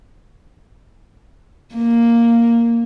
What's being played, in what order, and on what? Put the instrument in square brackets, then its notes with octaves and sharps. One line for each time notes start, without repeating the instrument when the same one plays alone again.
[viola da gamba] A#3